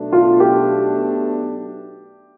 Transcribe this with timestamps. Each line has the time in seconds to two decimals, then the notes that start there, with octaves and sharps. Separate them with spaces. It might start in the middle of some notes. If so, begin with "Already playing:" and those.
Already playing: B1 B2 A3 D4
0.13 F4
0.40 G4